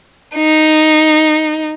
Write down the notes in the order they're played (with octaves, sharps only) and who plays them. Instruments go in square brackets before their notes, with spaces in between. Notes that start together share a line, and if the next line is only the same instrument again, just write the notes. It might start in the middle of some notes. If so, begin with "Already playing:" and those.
[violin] D#4